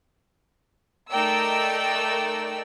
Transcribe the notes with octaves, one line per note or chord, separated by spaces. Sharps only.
A3 D#4 A#4 D5 G5 E6